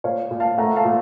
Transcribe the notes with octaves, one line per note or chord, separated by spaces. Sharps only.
A#2 C#5 F5
A#2
F5 A5
A3 F#5 A#5
F5 A5
A#2